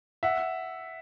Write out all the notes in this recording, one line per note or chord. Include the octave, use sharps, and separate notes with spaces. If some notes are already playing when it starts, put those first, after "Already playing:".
E5 F#5